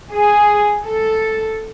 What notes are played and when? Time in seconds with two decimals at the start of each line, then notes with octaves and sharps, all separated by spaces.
0.11 G#4
0.85 A4